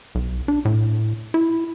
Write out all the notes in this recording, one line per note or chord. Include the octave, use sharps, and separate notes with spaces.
B1
D4
A2
E4